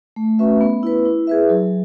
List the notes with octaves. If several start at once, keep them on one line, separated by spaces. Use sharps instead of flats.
A3
C#4 F#4 B4 E5
B3
E4 B4
E4
G#4 B4 E5
F#3